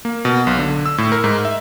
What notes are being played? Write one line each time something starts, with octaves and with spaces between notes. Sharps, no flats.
A#3
B2
B1
D3
E6
A2
A#4
G#2
E5